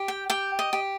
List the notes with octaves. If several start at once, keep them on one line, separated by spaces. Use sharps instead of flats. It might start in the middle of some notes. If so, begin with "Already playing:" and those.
Already playing: G4
G5
G4 G5
D#5
G4